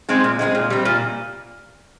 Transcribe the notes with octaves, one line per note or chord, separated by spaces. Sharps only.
G#3 C4 D#4 G#4
A#2
G#3 C4 D#4 G#4
A#2
G3 C4
A#2